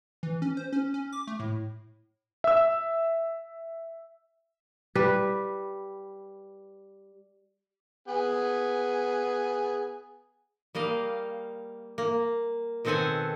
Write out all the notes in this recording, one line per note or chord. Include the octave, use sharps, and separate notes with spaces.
E3
C#4
C5
C#4
C#4
D6
A3
A2
E5 E6
G3 B4
B3 G#4 G#5
G3 A#3 D#5 F5
A#3
B2 D#3 C4 A4 F#5 G#5